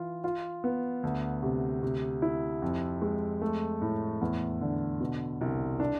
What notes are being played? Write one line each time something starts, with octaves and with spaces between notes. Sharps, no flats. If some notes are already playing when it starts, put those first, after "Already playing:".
Already playing: E3 F4
F4
B3
D2
C3
C3
E4
F2
G#3
A3
A2
E2
D3
B2
C2
D4